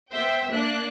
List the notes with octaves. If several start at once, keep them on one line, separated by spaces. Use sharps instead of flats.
B3 C5 E5 G5
A#3 D4 F#6